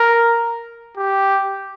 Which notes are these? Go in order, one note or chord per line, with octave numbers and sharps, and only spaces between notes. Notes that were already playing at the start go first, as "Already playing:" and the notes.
Already playing: A#4
G4